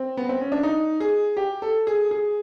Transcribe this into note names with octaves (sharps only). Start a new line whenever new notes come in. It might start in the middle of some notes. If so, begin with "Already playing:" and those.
Already playing: C4
B3
C4
C#4
D4
D#4
G#4
G4
A4
G#4
G#4